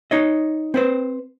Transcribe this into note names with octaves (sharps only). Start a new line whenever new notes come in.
D#4 C#5 D#5
C4 B4 C5